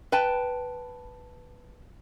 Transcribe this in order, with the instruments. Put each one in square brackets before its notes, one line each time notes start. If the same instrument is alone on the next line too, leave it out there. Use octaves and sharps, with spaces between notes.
[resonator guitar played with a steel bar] B4 G5 A5